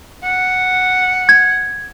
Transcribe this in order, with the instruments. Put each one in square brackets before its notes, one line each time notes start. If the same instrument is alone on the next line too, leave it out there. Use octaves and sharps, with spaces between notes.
[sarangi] F#5
[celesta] G#6